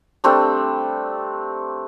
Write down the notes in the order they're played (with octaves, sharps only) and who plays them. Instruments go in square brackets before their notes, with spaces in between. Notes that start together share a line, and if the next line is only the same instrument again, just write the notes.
[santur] G3 A3 C4 D4